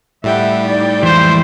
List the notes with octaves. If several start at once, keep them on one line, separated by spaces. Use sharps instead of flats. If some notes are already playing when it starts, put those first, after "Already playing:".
A2 G3 E5 F#5 G5
D#4 D5
F2 E3 G#3 C5